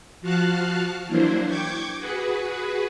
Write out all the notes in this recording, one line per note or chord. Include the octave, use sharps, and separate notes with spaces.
F3 F#4 F5 A5 F6 F#6
E3 F#3 A#3 D4 E4 C5
G5 C#6 D6 G6 G#6
F#4 G#4 B4